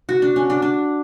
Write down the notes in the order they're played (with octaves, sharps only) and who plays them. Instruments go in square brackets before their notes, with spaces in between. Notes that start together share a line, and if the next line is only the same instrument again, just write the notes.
[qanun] F#4
D4
C#4
D4
D4